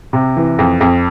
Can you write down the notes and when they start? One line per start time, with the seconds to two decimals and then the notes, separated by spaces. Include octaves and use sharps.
0.13 C3
0.37 E3
0.59 F2
0.81 F2